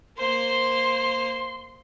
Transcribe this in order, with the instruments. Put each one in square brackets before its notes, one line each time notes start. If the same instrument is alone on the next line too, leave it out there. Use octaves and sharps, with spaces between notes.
[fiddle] A#3 C5 [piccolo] C6